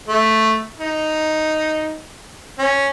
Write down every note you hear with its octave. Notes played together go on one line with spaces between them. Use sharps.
A3
D#4
C#4